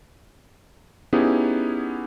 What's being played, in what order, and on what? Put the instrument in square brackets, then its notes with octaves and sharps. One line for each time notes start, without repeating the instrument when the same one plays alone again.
[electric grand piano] B3 C#4 D#4 E4 G4 G#4